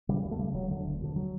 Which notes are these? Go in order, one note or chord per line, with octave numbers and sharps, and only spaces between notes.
C#3 G3
D2
A3
C#3 G3
E1 F#3
D2 D3
E1
D2 D3
F#3